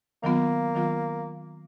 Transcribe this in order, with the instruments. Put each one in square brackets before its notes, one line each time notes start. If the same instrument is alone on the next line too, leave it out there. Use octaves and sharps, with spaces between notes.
[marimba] D#3 F#3 B3 F4 [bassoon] A#3
[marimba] D#3 F#3 B3 F4